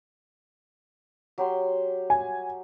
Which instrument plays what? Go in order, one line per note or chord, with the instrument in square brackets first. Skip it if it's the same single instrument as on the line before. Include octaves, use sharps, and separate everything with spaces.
[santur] F#3 G4 C6
[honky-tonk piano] G#5